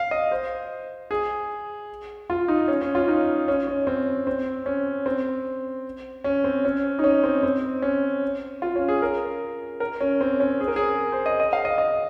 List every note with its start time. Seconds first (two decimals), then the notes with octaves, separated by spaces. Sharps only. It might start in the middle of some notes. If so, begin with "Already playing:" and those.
Already playing: F5
0.11 D#5
0.31 C5
1.11 G#4
2.30 F4
2.48 D#4
2.68 C#4
2.82 C#4
2.95 F4
3.08 D#4
3.48 C#4
3.67 C#4
3.87 C4
4.27 C4
4.66 C#4
5.06 C4
6.24 C#4
6.44 C4
6.65 C#4
6.99 D#4
7.04 C#4
7.24 C4
7.43 C4
7.82 C#4
8.62 F4
8.76 C#4
8.88 G#4
9.02 A#4
9.80 A#4
10.01 C#4
10.21 C4
10.40 C#4
10.60 G#4
10.68 A#4
10.76 G#4
11.12 C5
11.26 D#5
11.40 D#5
11.53 F5
11.65 D#5
11.78 D#5